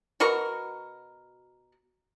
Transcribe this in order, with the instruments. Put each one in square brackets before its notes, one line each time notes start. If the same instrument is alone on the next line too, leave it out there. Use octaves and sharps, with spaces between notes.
[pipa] B2 F#4 A#4 C#6